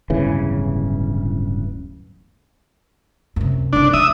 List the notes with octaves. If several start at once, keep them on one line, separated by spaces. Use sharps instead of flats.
D1 G1 C#3 E3
F#2 C3
C2 F2 D4
F#3 E5 D#6